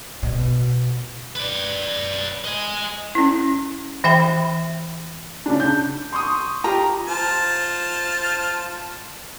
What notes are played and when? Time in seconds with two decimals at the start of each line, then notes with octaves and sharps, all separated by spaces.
0.23 B2
1.36 B4 D5
2.45 D#5 G#5
3.15 C#4 E4
4.04 E3 E5 G5 B5
5.46 C#3 D4
5.60 G6
6.13 C6 C#6 D#6
6.64 F4 G4 A#5
7.07 F4 C5 A5